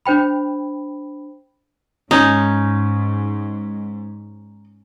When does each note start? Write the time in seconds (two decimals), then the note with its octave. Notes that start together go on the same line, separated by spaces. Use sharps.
0.06 D4 C5 G5 B5
2.11 G#2 C#4 D#4